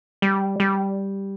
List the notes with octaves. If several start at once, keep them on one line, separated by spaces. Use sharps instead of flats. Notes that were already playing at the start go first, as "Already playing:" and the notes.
G3
G3